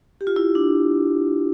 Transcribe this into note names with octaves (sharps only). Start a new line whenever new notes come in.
G4
F4
E4
D4